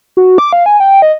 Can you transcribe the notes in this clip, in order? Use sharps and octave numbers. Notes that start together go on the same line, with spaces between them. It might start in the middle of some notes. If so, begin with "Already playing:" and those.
F#4
D6
F5
G#5
G5
D#5